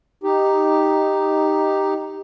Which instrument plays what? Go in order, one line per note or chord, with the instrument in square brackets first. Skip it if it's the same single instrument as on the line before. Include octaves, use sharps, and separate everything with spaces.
[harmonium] D#4 G4